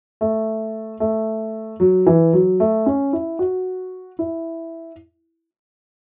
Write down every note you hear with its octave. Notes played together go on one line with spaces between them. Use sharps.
A3
A3
F#3
E3
F#3
A3
C#4
E4
F#4
E4